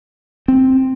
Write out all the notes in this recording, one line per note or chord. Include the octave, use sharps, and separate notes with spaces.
C4